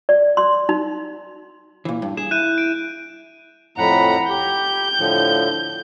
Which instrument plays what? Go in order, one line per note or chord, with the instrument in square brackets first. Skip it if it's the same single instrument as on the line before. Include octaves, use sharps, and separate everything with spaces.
[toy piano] D5
C6
D#4
[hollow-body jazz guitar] A#2 E3
G2
[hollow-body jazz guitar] G#4 [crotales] E7
[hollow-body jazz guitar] E4 [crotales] F#6 G6 D#7
[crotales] D7
[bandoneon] F2 A2 F#5 [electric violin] A#5 B5
[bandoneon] G4 [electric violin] G6
[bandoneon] A2 D3 F3